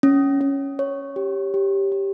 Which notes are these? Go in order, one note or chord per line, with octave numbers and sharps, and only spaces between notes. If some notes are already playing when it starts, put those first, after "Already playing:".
C#4
C#4
C#5
G4
G4
G4